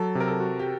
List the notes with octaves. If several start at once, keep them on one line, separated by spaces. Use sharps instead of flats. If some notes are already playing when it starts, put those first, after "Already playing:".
Already playing: F#3 A4
C3
A#4
A4
F#4
G4